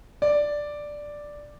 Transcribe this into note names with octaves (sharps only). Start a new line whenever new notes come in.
D5